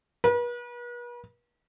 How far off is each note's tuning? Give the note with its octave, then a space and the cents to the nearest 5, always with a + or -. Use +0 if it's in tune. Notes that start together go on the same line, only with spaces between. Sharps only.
B4 -40